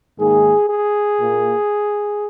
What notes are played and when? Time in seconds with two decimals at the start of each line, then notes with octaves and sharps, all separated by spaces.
0.18 G#2 D#3 A#3 G#4
0.68 G#4
1.19 A#2 A#3